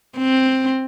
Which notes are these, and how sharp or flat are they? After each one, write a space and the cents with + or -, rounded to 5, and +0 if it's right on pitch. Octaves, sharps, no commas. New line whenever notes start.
C4 +5